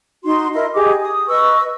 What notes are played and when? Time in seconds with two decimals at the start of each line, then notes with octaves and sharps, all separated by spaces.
0.24 D#4 F#4 C6
0.54 E4 A#4 D#5
0.75 G4 G#4 D#5 D6
1.00 D#6
1.28 B4 D#5 C#6 E6